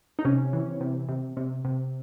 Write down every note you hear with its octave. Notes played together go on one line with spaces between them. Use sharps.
D#4
C3 C#4
E3
C3
C3
C3
C3